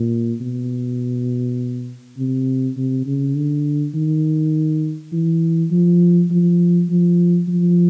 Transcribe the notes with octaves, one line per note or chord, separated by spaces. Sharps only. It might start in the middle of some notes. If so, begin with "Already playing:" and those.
Already playing: A#2
B2
C3
C3
C#3
D3
D#3
E3
F3
F3
F3
F3